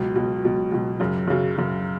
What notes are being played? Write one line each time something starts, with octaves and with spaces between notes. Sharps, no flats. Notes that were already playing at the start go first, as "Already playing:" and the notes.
Already playing: C#2 B2 F#3
C#2 B2 F#3
C#2 B2 F#3
C#2 B2 F#3
F#2 C#3 F#3
F#2 C#3 F#3
F#2 C#3 F#3